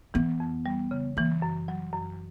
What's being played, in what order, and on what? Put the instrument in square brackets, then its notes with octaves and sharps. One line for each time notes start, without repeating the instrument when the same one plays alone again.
[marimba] E3 [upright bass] B3
[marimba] F2
G3
C#3
[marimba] E3 [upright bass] A#3
[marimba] F#2
F#3
F#2